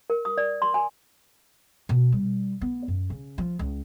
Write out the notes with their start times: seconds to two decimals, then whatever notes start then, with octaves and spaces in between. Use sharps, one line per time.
0.10 A#4
0.25 D#6
0.38 D5
0.62 C6
0.74 G#5
1.89 B2
2.12 G3
2.61 B3
2.88 F#2
3.10 C#3
3.38 F3
3.59 C#2